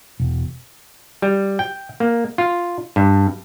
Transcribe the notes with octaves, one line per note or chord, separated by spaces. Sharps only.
E1
G3
G5
A#3
F4
G2